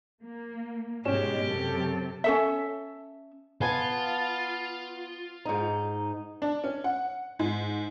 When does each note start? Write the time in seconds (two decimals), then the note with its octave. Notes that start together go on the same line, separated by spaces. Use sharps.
0.22 A#3
1.05 G#2 B2 G#3 C#4 G4 E7
1.44 F#2 C3 A4
2.24 C#4 A4 E5
3.61 B3 F4 G#5 A5
5.45 G#2 D#4
6.42 D4
6.64 C#4
6.84 F#5
7.39 G#2